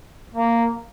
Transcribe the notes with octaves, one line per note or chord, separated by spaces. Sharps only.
A#3